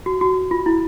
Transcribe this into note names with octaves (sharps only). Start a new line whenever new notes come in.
F#4
F#4
F4
E4